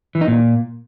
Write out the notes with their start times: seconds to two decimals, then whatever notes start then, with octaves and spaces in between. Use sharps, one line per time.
0.15 E3
0.21 D#4
0.27 A#2